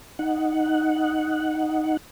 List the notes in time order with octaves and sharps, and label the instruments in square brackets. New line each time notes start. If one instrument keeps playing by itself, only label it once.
[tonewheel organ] D#4 F#5